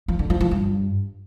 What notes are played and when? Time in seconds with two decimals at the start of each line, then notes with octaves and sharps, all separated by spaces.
0.08 F3
0.19 D3
0.30 F3
0.41 F3
0.51 G2